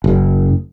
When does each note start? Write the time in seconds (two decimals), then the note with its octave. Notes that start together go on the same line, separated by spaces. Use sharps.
0.04 F#1